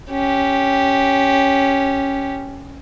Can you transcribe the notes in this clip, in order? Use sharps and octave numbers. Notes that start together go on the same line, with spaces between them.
C#4 G4